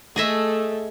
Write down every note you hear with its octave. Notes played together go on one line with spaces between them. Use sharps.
A3 G#4 A4 D#5 E5